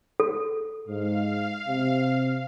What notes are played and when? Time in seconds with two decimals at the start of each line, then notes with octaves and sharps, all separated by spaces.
0.20 A4
0.87 G#2 F5
1.66 C3